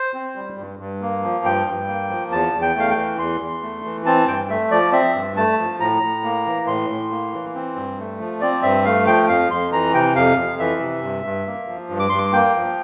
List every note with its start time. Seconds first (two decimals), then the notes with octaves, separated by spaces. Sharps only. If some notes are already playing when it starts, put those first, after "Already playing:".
Already playing: C5
0.14 C4
0.36 G3
0.58 G2
0.79 G2
1.01 A#3
1.23 F3
1.45 G2 G5
1.67 G2
1.88 A#3
2.10 F3
2.31 E2 A5
2.53 E2
2.62 G5
2.75 A3 F5
2.90 G5
2.97 E3
3.19 E2 C6
3.41 E2
3.62 A3
3.85 E3
4.06 C4 A5
4.28 G2 G5
4.50 A3 E5
4.71 F3 D5
4.93 C4 E5
5.15 G2
5.36 A3 A5
5.59 F3
5.80 A2 A#5
6.02 A2
6.23 A#3
6.46 E3
6.67 A2 C6
6.89 A2
7.11 A#3
7.33 E3
7.55 C4
7.76 G2
7.99 A3
8.20 F3
8.41 C4 D5
8.63 G2 E5
8.85 A3 F5
9.07 F3 G5
9.29 F2 F5
9.51 F2 C6
9.72 E3 A#5
9.94 C3 G5
10.16 F2 F5
10.37 F2
10.59 E3 E5
10.81 C3
11.03 G2
11.25 G2
11.47 A#3
11.68 F3
11.90 G2
12.00 D6
12.09 G2 C6
12.18 D6
12.33 A#3 G5
12.56 F3